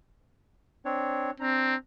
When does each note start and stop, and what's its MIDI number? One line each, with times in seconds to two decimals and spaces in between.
0.85 1.31 60
0.85 1.31 62
0.85 1.31 73
1.40 1.75 60
1.40 1.76 62
1.40 1.76 82